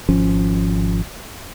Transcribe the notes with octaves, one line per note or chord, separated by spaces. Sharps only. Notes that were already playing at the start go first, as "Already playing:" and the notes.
G#1 F3 C#4